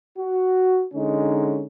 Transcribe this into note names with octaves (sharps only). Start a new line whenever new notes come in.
F#4
D3 G#3 C#4 D#4